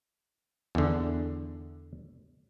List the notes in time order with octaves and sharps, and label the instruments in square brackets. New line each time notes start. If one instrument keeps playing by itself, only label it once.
[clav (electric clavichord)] E2 D3